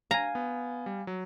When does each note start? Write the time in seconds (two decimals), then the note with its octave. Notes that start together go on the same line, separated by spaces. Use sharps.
0.11 F5 G#5 A#5
0.35 B3
0.86 G3
1.07 F#3